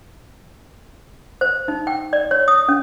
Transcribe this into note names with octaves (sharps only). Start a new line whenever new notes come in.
C5
D#4
G5
D5
C#5
D#6
C#4